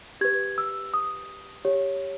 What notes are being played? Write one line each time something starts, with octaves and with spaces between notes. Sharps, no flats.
G4 B4 G#6
E6
D#6
G4 C#5